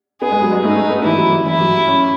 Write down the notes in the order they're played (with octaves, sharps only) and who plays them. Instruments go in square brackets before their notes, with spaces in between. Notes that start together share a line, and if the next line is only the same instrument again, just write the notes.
[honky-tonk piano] B3 [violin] G#4
[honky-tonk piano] G#3
F#3
G#3
[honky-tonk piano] A3 [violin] D#4
[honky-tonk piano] B3
[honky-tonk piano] E3 [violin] E4
[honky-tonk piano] F#3
E3
[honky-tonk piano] E3 [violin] E4
[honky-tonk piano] F#3
C#4